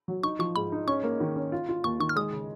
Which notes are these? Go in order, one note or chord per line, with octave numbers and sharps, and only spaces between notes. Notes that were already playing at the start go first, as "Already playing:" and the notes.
F#3
D#4 C#6
F3 C#6
G#2 B5
D#4
C#4 C#6
A#3
D#3
C#4
F4
F4
D#2 C#6
D#3 C#6
F6
G#3 D#6
C#3